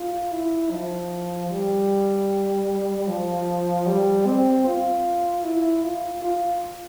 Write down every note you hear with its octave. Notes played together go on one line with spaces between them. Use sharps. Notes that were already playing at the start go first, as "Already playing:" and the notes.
Already playing: F4
E4
F3
G3
F3
G3
C4
F4
E4
F4
F4